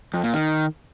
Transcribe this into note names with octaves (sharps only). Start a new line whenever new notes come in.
F2
A#2
D#3